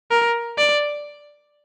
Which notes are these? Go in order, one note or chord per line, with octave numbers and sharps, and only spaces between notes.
A#4
D5